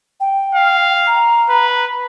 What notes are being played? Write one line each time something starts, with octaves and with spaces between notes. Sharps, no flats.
G5
F5
A#5
B4